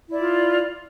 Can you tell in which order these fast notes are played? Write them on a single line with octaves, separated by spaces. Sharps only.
E4 D5 F4